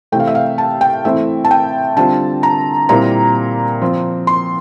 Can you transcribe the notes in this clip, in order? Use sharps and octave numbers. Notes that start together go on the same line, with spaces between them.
C3 E3 A3 C4 G5
F5
E5
F5
A5
G5
E3 A3 C4 E4 E5
A5
G5
D3 G3 C4 F4 A5
A#5
A#2 G3 C4 E4 A#5
F3 C4 F4
C6